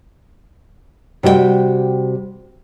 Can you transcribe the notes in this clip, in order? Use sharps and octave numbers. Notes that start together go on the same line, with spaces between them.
C3 G3 F#4 D5 G5